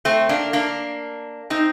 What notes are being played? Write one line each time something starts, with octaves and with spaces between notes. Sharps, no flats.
A3 C4
A#3 D4
A#3 D4
C4 D#4